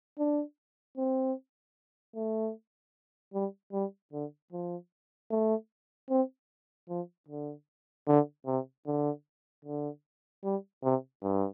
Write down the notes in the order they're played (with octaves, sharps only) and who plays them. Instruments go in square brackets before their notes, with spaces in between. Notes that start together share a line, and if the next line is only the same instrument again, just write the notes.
[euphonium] D4
C4
A3
G3
G3
D3
F3
A3
C4
F3
D3
D3
C3
D3
D3
G3
C3
G2